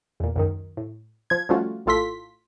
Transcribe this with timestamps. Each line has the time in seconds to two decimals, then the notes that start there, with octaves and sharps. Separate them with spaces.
0.20 E2 A#2
0.36 C#2 F#2 D#3
0.77 A2
1.30 F3 G#6
1.49 F3 G3 A3 C#4 F4 F#4
1.86 A#1 A2 F4 A4 C6 B6